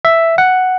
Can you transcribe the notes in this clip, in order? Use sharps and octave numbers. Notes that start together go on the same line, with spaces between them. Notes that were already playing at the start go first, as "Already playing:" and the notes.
E5
F#5